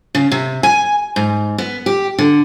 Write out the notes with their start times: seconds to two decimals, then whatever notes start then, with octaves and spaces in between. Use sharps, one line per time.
0.15 C#3
0.31 C3
0.63 G#5
1.16 G#2
1.58 B3
1.86 G4
2.18 D3